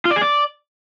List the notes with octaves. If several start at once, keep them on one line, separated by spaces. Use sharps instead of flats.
F4
D5
G#4
D5